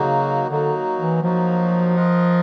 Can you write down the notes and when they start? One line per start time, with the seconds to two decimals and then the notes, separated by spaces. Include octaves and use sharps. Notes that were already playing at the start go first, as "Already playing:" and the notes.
Already playing: C#3 F#3 A#3 D#4 F#4
0.50 D3 F#3 A#3 D#4 F#4
0.98 E3
1.22 F3 F#3 A#3 D#4 F#4
1.95 F4 A#4 D#5 F#5